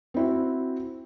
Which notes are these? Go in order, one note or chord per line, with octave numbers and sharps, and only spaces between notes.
C4 E4 F#4